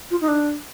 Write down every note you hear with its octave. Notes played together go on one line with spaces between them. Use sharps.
F4
D#4
D4